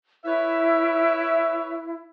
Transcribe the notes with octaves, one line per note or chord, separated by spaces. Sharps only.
E4 B4 C#5 E5